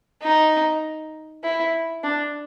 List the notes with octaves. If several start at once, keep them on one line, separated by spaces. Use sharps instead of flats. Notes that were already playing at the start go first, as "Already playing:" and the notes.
D#4
E4
D4